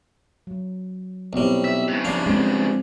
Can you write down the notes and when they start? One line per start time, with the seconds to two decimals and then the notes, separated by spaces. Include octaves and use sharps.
0.47 F#3
1.33 B1 G3 B3 C4 E4
1.64 E5
1.88 G2 C#3
2.05 F3 D4 F5
2.26 G#3 C4